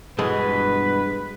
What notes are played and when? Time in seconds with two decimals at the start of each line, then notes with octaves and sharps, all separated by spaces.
0.18 G2 B2 E3 G#3 B4